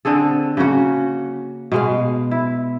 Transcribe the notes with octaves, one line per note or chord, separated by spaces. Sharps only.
D3 C4 G#4 A4
C#3 A#3 C#4 F#4
B2 G#3 F5
E4